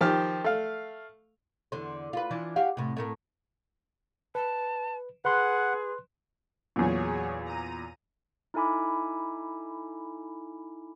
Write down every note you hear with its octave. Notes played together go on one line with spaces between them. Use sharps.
D#3 F3 G4 F6
A3 F5
E2 D3 C5
F4 B4
E3 F3 D4
F#4 G4 F5
A2 C3
A2 A3 A#4
B4 A5
G#4 B4 F#5 C6 F#6
E2 A#2 F#3 G#4 C#5
A#5 D#7
D#4 E4 A4 G#5 B5 D6